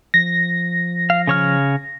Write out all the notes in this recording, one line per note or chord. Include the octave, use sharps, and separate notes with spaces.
F3 A#6
F5
C#3 C#5 F6